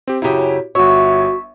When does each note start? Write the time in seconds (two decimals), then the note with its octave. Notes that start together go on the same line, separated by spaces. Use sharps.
0.08 C4 G4
0.22 F#2 C#3 E4 G4
0.75 G1 F#4 C#5 E5 C#6